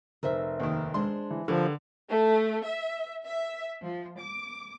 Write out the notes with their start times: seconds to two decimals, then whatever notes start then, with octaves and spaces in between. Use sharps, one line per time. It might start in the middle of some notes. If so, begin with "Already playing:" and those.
0.23 F1 A#4 C5 E5
0.60 D#2 D#3
0.94 G#3 D4 C5 C6
1.31 E3
1.48 D3 F3 G4 A#4 B4
2.08 A3
2.64 E5
3.26 E5
3.80 F3
4.18 D6